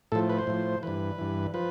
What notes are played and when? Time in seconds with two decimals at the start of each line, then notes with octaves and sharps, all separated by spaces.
0.12 A2 F3 A4
0.29 B4
0.38 C5
0.47 A2 F3
0.83 G2 E3 B4
1.18 G2 E3
1.54 F3 B4